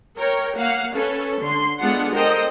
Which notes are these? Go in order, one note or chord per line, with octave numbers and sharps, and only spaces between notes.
A#4 C#5 G5
A#3 F5 F#5
C#4 A4 B4
D3 C6
G#3 B3 D4 F4 A4 F#5
A4 A#4 C5 D#5 G5